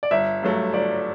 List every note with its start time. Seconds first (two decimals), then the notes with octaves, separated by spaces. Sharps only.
0.03 D5
0.11 G1 E5
0.43 G2 F#3 A3
0.73 G1 D5